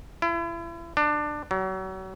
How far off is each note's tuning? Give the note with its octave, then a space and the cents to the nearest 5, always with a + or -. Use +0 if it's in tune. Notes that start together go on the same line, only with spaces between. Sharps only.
E4 +35
D4 +20
F#3 +35